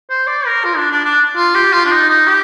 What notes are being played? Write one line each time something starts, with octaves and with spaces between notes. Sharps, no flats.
C5
D5
A#4
F4
D4
D4
D4
F4
G4
F4
D4
D#4
D#4
G4